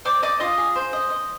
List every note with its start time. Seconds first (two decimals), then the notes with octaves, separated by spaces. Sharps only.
0.05 C5 D5 D6
0.23 D5 D#5 D6
0.40 F4 D#5 D#6
0.58 G#4
0.76 C5
0.93 D#5
1.10 D#5